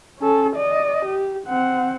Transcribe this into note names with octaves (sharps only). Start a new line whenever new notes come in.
C#4 A4
D5 D#5
G4
C4 F#5